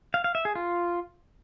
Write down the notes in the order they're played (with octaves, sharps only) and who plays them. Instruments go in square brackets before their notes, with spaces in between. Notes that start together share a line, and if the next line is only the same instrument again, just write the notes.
[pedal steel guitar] F5
F5
E5
G#4
F4